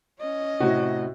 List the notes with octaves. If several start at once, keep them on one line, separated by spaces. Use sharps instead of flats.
C#4 D#5
A2 C3 F#4